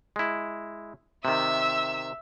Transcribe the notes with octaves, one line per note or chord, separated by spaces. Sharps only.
G#3 E4
C3 D#3 E5 E6